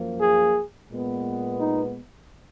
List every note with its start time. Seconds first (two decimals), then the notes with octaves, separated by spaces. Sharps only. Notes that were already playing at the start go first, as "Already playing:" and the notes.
Already playing: F#2 F3 A#3
0.19 G#4
0.89 A#2 G#3 B3
1.59 D#4